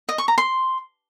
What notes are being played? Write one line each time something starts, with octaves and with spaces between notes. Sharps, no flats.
D#5
C#6
A#5
C6